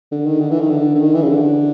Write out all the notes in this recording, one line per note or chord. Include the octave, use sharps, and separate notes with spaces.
D3
D#3
D3
E3
D#3
D3
D3
D#3
E3
C#3
D3